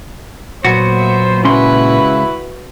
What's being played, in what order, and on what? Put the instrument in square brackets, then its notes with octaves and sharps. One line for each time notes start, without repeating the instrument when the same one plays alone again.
[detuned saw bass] A#2 [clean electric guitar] F#3 B3 F#4 [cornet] C5
[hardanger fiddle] E5
[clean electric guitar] C#2 C#4 C6 [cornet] E4 [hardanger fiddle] F#4 B4